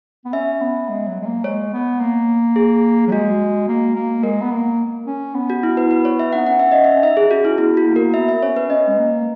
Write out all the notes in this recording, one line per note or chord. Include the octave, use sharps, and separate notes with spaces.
B3
C#4 E5
B3
G#3
F#3
G#3
A#3
G#3 C#5
B3
A#3
G#4
F#3
G#3 F#4
A#3
A#3
G#3 A#4
B3
A#3
C#4
B3
F#4
E4
B4
B4
C#5
E5
D#4 F#5
C#4 F#5
E5
D#5
E5
C#4
D#4 E5
G#4
C#4 F#4
E4
B3 E4
F#4
A#3
A#4
B3 E5
E5
C#4 C#5
B4
C#4 D#5
G#3
A#3